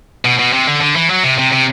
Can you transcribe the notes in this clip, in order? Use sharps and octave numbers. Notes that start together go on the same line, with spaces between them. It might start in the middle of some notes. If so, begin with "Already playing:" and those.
B2
B2
C3
D3
D3
E3
F#3
C3
C3
C3